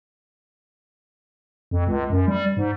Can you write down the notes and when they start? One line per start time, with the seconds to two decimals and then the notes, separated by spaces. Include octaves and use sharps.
1.71 F2
1.87 C#2
2.10 F#2
2.28 G3
2.57 G#2